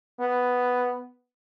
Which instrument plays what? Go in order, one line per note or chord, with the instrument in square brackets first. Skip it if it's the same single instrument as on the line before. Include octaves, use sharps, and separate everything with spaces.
[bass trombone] B3